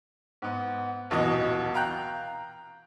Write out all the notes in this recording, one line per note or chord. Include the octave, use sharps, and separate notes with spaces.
G#2 B3
D#1 B1 B2 E3 D#5
F5 G5 A#5 F#6 G6